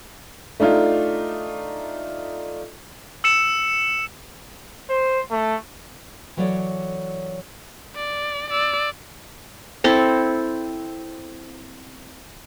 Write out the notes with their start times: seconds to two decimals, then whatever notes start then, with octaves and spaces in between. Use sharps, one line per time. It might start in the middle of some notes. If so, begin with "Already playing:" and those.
0.60 A3 D4 D#4 F4
3.24 E6 C#7 E7
4.90 C5
5.31 A3
6.37 E3 F#3 A4 C#5 D5
7.95 D5
8.50 D5 E6
9.84 C4 E4 A4